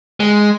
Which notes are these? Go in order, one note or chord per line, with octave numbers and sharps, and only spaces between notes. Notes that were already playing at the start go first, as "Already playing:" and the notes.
G#3